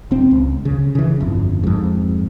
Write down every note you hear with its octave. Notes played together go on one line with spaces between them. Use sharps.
D#1 C4
C#2
C#3
C#3 E3
G1 F2
F2 G#2